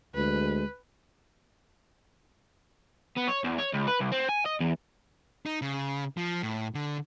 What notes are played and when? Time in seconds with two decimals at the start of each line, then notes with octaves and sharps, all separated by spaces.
0.15 D2 G#3 B4
3.17 B3
3.28 C#5
3.44 E2
3.59 C#5
3.73 C#2
3.87 B4
4.00 C2
4.12 C4
4.29 G#5
4.45 D#5
4.60 E2
5.46 D#4
5.62 C#3
6.17 F3
6.43 A2
6.75 D3